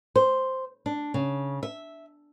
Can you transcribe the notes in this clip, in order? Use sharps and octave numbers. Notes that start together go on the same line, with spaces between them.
C5
D4
C#3
E5